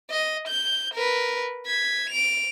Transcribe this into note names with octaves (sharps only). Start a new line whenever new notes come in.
D#5
G6
A#4 B4
G#6 B6
D7 F7